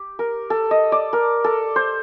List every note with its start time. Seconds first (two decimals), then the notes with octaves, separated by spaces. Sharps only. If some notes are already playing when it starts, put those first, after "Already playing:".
Already playing: G4
0.19 A#4
0.50 A4
0.71 D#5
0.92 D5
1.13 A#4
1.44 A4
1.76 C5